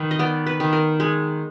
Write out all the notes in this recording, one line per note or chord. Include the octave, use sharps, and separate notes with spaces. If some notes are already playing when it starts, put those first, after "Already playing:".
Already playing: D#3 B4
D#5
B3 D5
B4
D#3
A#4
G#3